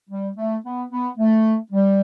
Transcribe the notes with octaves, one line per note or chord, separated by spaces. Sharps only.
G3
A3
B3
B3
A3
G3